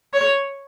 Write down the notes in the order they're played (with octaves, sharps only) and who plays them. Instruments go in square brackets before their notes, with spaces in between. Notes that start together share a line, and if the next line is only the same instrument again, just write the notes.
[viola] C#5